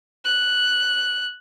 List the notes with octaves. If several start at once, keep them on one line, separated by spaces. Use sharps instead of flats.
F#6